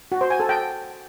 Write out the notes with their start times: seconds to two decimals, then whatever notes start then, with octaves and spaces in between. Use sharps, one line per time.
0.12 F#4
0.21 C5
0.30 G#5
0.40 A4
0.49 G5